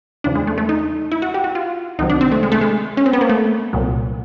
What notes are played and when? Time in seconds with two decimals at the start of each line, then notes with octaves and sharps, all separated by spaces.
0.24 E2 C#3 F3 D4
0.35 G#3
0.47 A3
0.58 A3
0.69 D#4
1.12 E4
1.22 F#4
1.34 G4
1.44 F#4
1.55 F4
1.99 C2 C3 D#3 F#3 D#4
2.10 D4
2.21 C4
2.31 A3
2.43 G#3
2.52 A3
2.61 G#3
2.97 C#4
3.06 C4
3.13 B3
3.21 A#3
3.29 A3
3.73 C2 A#2 F#3